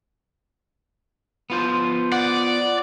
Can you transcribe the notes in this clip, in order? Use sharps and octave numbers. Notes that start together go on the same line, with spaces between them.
B3 F4 C5
D5 F#5